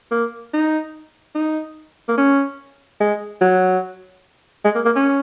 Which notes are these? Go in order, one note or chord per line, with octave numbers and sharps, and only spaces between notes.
A#3
D#4
D#4
A#3
C#4
G#3
F#3
G#3
A#3
A#3
C#4